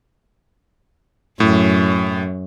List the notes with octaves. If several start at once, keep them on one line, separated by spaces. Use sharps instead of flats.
F#2 A2